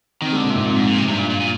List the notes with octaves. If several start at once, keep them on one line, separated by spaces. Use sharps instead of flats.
D#3 C4
G#3
D3
A#2
G#2 C3
F2 A#2
G#2
A#2
C3
G2 C3
A#2
A#2
A#2